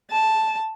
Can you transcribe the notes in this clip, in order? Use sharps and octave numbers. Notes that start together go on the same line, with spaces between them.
A5